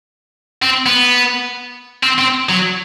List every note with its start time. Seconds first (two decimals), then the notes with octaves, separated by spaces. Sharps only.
0.62 C4
0.86 B3
2.03 C4
2.18 C4
2.49 F#3